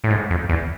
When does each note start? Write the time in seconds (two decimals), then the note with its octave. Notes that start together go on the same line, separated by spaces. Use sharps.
0.04 A2
0.10 G#2
0.30 F2
0.49 E2